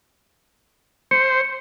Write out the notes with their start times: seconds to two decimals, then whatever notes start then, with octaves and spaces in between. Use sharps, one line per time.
1.11 C5 C#7